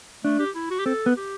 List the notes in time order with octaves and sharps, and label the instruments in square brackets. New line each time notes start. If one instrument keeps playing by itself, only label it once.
[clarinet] A3 [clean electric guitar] D4
[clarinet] G4
E4
F#4
G4
[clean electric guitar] C4 [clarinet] A4
[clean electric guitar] B3
[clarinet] G4